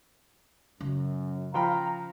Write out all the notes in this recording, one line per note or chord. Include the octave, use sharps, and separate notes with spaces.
F#2 C#3
F3 F5 G5 A#5 B5